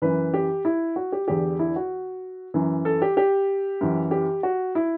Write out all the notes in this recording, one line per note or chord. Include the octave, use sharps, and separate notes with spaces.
F#2 E3 B4
G4
E4
F#4
G4
E2 D3 G4
E4
F#4
F#2 E3
A4
G4
G4
F#2 E3
G4
F#4
E4